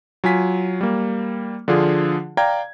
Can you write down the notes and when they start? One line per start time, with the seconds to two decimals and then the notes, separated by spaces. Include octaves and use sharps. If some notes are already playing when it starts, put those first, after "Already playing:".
0.24 F#3 F4 G#5 B6
0.81 G3 A#3
1.68 D3 F3 D4 F4 G#4
2.37 D5 F5 G5 A#5 G#6